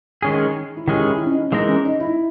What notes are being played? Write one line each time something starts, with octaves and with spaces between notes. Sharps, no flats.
D#3 G#3 C#4 G#4
E4
D#3 G#3 C#4 G4 G#4
E4
C#4
D#4
E3 G#3 B3 D#4 A#4
C#4
D#4
E4